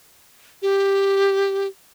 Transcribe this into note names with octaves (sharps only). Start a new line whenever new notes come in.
G4